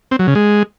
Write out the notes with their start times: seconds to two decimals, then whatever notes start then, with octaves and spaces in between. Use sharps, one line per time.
0.11 C4
0.19 F#3
0.27 C#3
0.35 G#3